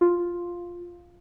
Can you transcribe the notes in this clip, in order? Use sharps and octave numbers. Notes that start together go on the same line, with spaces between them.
F4